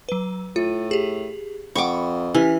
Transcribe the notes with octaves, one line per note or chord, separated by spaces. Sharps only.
F#3 B4
A2 F4
G4 G#4
F2 F#5 G5 B5 C#6 D6
E3 C#4 G4 G#5